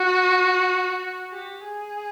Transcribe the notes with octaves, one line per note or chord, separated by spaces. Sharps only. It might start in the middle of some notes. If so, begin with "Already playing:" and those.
Already playing: F#4
G4
G#4